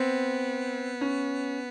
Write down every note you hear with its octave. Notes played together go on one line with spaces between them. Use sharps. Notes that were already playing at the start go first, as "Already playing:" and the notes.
Already playing: B3 C4
C#4